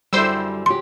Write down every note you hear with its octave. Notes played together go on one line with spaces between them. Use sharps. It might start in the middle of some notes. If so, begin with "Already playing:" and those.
F#2 D3 G3 E4 C5 E6
C#3 F#3 G4 C6